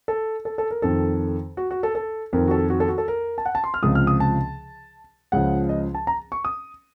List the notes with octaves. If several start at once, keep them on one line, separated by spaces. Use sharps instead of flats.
A4
A4
A4
A#4
F2 D#3 A4
F#4
F#4
A4
A4
F2 D#3 A#4
F#4
A4
F#4
A4
F#4
A4
A#4
A5
F#5
A5
C6
F6
C#2 C3 F3 D#6
F6
D#6
A5
C#2 C#3 F3 F#5
D#5
A5
A#5
C#6
D#6